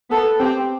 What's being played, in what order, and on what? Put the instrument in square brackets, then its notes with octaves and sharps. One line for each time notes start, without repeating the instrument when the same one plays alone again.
[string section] B3 [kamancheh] A4
[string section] C4 [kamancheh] G4